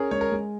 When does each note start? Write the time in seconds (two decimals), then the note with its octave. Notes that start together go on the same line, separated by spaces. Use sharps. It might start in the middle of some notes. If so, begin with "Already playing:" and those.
Already playing: C#4 G#4 A#4 C#5
0.11 G#3 C#5
0.21 A#4
0.32 G#3